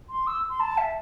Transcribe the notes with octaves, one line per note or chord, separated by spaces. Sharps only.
C6
E6
C6
A5
E5